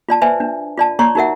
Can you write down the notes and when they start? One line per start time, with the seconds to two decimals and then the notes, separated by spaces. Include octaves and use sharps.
0.09 F4 D5 A5
0.22 B4 C5 D5 E5 G#5
0.40 D4
0.77 F4 D5 A5
0.99 C#5 D5 A#5 C6 C#6
1.15 D#4 F#4 A#4 E5 F#5